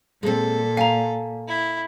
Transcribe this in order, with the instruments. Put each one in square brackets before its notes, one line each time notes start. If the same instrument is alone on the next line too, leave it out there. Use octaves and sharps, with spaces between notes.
[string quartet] A#2 [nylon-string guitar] G#3 C4 [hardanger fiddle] A4
[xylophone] F5 A#5 [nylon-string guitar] G#5
[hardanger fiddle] E4